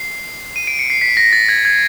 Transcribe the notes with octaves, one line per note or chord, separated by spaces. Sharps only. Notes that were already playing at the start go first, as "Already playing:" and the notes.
Already playing: C7
D#7
D7
C#7
C7
B6
A#6
A6
G#6
G#6